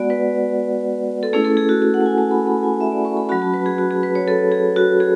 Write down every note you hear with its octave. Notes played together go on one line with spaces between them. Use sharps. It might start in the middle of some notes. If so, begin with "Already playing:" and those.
Already playing: G#3 B3 F#4 D5 F#5
B4
A4
A3 C#4 E4 G#4
A4
G#4
F#4
G#4
F#5
A5
G#5
A5
B5
B5
G#5
E5
D5
C#6
B5
F#3 C#4 F#4 B5
A5
B4
G#4
F#4
G#4
B4
C#5
A4
G#4
F#4
G#4